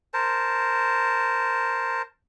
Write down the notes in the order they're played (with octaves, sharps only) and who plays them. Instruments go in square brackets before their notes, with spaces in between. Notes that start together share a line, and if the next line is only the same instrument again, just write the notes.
[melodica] A#4 C5 A5